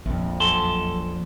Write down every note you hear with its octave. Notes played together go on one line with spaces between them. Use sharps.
A#1 F2
F#2 A4 C6